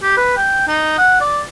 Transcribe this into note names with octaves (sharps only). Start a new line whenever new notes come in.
G4
B4
G5
D#4
F#5
D5